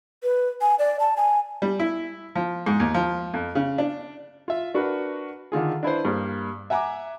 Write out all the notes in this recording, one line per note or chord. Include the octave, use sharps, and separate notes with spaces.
B4
G#5
D5
A5
G#5
G3
E4
F3
G#2
D#2
F3
F2
C#3
D4
F4 E5
D4 F#4 A#4 B4
D3 D#3 F4 G#4
D4 E4 B4 C5
G2 G3 A#3
E5 F#5 G#5 A#5 D6